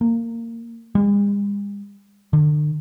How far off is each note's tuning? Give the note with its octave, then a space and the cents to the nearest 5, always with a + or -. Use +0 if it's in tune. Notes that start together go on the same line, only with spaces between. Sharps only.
A#3 -20
G#3 -45
D3 +35